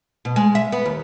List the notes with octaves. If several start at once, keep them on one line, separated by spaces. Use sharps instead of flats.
B2
G#3
E5
B3
D#2